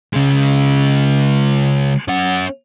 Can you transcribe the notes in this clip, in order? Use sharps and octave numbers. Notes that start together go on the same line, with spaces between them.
C#3 G#3
C#4 F#5